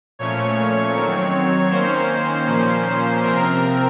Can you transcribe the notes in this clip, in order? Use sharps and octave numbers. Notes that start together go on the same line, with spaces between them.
A#2 F3 A3 C#4 C#5
D#3 F#3 C4
D#3 A#3 C#4 C5
A#2 F3 A#3 C#4
C3 F3 C4 A#4